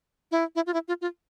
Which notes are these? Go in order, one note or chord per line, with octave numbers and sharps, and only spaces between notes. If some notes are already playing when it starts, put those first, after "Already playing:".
E4
E4
F4
E4
F4
F4